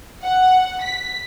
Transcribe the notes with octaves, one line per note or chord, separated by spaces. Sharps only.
F#5
B6